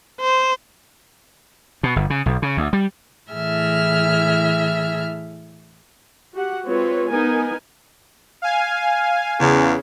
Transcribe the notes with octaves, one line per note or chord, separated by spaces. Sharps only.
C5
B2
G1
C#3
B1
C#3
D2
G3
A2 E3 G#4 E5 F6
F#4 G4 F#5
G#3 C4 F4 B4 C#5
B3 D#4 A#4 G#5
F5 G#5
E2 C#3